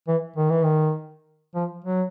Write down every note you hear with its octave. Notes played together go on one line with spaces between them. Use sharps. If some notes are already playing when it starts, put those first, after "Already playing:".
E3
D#3
E3
D#3
F3
F#3